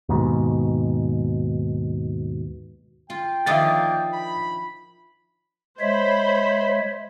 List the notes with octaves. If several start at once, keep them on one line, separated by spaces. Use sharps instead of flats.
D#2 G#2 B2
F4 G5
D#3 F3 A#3 D4 E5 D#6 A6
B5
G#3 C5 C#5 E5 B5